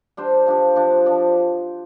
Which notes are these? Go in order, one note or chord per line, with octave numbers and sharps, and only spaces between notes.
G3 D4 G4 C5
F3 D4 G4
F3 D4 G4
F3 D4 G4